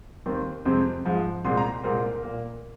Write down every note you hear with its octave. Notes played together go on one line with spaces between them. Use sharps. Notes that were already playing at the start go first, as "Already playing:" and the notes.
D#2 D#3 C4
F2 C3 G#3 C4
G#2 F3 G#3
C2 A#2 G#3 C4 C6
A#5
C2 A#2 G#3 C4 A#4
A#2 A#3